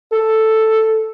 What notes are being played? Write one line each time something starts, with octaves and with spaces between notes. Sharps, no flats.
A4